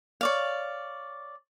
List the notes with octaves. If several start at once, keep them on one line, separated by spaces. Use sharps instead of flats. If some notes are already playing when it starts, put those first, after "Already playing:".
C#5 D5 F5